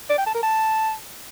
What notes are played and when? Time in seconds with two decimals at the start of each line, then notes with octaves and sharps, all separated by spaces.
0.10 D5
0.18 G5
0.26 A5
0.35 A#4
0.43 A5